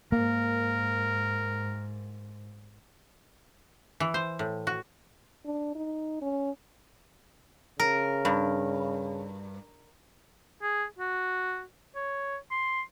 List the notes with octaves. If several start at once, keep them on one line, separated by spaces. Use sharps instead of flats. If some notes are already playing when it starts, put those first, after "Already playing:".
G#2 A#3 A#4
E3
C5
A2
F#4
D4
D#4
C#4
C#3 A#4
G2
G#4
F#4
C#5
C6